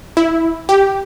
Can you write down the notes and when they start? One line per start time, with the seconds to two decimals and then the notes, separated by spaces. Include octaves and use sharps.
0.17 E4
0.69 G4